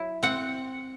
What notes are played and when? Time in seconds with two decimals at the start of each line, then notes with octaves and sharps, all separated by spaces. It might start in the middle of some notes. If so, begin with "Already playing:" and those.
Already playing: F#3 E4
0.23 C4 F#5